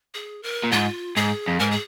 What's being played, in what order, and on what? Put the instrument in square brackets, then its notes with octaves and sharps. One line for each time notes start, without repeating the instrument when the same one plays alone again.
[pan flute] G#4
A#4
[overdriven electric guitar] A#2
[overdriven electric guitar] G#2 [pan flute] F4
[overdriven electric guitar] G#2 [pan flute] G#4
[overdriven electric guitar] F2
[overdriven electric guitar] G#2 [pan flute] A#4
[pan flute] G#4